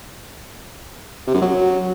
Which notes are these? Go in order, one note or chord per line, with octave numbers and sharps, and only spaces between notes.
C3
F#2
F#3